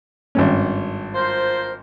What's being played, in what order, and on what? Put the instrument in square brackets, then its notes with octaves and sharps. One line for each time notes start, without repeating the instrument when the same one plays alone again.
[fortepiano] G#1 G2 C#4
[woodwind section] F4 A#4 C5